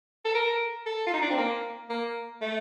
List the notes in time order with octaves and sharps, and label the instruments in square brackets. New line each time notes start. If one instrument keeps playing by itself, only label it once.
[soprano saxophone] A4
A#4
A4
F4
D#4
D4
C4
A#3
A#3
A3